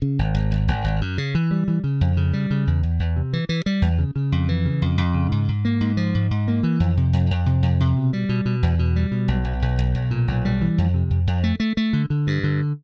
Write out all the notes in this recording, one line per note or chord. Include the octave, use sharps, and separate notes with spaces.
C#3
G#1
G#1
G#1
G#1
G#1
F#2
C#3
E3
G3
E3
C#3
F2
C#3
G3
C#3
E2
E2
E2
C3
E3
E3
G3
E2
C#3
C#3
F2
E3
C#3
F2
F2
C#3
G#2
G#2
A#3
G#2
F3
G#2
G#2
A#3
E3
F2
C3
F2
F2
C3
F2
C3
B2
G3
B2
B2
E2
B2
G3
B2
B1
B1
B1
B1
B1
A#2
B1
G3
E3
F2
C3
F2
F2
A3
A3
A3
D3
D3
G2
D3